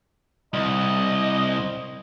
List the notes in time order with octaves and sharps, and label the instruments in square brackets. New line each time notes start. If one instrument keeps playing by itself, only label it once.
[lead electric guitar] C2 [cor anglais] D#5